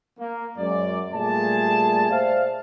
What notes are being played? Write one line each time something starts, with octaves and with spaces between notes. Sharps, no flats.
A#3
F#2 G#3 D5
A#2 G3 A3 G#4 A5
C5 D5 E5 F5